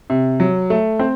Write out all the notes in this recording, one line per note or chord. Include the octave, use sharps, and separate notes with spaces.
C3
F#3
A3
C4